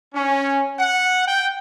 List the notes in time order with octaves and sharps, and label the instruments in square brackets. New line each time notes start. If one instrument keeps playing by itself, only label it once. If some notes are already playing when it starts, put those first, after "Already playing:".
[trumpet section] C#4
F#5
G5